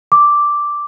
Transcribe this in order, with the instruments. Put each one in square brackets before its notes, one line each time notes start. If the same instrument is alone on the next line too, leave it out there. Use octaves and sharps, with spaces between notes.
[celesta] D6